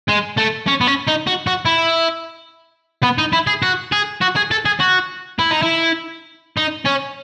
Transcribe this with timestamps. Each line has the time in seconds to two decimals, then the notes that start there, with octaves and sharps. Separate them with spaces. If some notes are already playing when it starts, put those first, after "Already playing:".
0.09 G#3
0.38 A3
0.68 C#4
0.81 B3
0.87 C#4
1.07 D#4
1.27 F#4
1.47 F#4
1.66 E4
3.03 B3
3.18 D#4
3.33 E4
3.47 G#4
3.62 F#4
3.92 G#4
4.21 F#4
4.36 G#4
4.51 A4
4.65 G#4
4.80 F#4
5.39 E4
5.51 D#4
5.62 E4
6.57 D#4
6.86 C#4